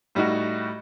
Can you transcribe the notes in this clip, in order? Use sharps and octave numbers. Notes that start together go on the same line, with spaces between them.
A2 G3 D#4 F#4